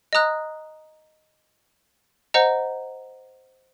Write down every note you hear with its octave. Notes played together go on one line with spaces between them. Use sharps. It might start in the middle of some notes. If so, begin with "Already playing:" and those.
D#5 A#5 D#6 F#6
C5 D#5 F#5 A#5